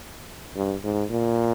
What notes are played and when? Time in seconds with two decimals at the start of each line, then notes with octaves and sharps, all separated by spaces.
0.55 G2
0.84 G#2
1.11 A#2